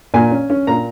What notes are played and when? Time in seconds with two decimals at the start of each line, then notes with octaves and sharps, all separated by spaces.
0.14 A#2 G#5
0.31 C#4
0.50 C#4
0.67 A#2 A#5